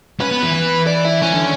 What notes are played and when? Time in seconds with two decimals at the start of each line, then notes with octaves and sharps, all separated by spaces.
0.20 C#4 B4
0.31 B3
0.42 E3
0.54 E3
0.87 D5
1.05 E4
1.21 E3 C#4
1.34 D3